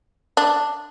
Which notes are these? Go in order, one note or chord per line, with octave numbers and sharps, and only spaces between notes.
D4